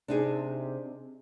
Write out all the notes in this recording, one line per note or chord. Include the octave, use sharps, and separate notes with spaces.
C3 D4 D#4 G#4